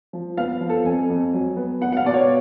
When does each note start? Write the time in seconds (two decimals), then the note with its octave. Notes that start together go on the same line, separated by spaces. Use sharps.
0.13 F3
0.37 B3 F5
0.61 F3
0.69 A4
0.84 F2 G#5
1.10 F2
1.33 F#3
1.56 B3
1.81 B3 F#5
1.92 F#5
1.97 F5
2.05 B2 D5
2.14 C#5